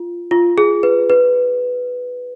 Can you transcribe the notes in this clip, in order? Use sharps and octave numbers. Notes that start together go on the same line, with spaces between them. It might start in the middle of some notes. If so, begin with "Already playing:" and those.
Already playing: F4
F4
G#4
B4
B4